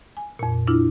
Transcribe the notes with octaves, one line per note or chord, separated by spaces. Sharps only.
G#5
F2 A#2
D4 E4 F4